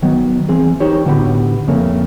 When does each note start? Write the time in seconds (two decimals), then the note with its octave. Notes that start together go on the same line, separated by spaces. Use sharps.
0.02 D#3 F#3 B3
0.49 E3 C4 G#4
0.80 D#4 G4 C5 C#5
1.06 A2 D3 B3 F#4 G4 B5
1.68 F2 C#3 A3 A#3 C#4